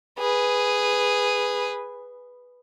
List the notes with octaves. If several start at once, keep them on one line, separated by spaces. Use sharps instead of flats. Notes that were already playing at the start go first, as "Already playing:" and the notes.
G#4 B4